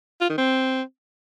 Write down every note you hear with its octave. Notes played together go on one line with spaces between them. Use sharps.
F4
D#3
C4